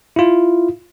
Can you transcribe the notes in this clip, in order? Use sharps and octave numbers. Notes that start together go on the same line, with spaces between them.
E4 F4